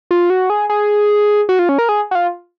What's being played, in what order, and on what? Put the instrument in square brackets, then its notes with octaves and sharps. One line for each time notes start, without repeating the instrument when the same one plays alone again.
[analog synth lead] F4
F#4
G#4
G#4
F#4
F4
C#4
A#4
G#4
F#4
F4